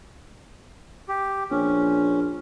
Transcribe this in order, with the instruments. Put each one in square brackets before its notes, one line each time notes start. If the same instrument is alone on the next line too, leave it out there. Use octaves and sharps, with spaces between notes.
[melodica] G4
[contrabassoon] A#1 [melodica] C#4